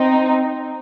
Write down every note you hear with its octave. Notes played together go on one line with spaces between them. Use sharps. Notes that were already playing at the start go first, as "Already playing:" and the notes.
Already playing: C4 D#4